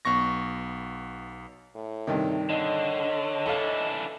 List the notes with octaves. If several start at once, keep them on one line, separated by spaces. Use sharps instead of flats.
B1 B3 C#6 A#6
A2
G2 C3 D#3
D3 C#5 D#5
E3 D4 A4 F5